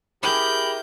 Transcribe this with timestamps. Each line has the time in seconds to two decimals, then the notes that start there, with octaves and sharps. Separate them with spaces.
0.23 E4 G4 G#4 A#4 B5 G6